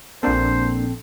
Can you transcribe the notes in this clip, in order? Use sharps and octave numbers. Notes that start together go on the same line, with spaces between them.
A#1 A#3 C4 D4 A4 C5